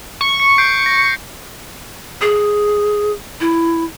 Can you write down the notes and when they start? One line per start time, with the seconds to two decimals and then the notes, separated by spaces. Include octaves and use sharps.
0.21 C#6
0.40 C#7
0.58 G6 C7 D7
0.86 A#6
2.21 G#4
3.40 E4